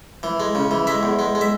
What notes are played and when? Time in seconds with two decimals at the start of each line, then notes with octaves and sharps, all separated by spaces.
0.23 E3
0.40 G#3
0.55 C#3
0.71 E3
0.87 G#3 E5
1.03 E2
1.19 G#3
1.35 G#3
1.41 E5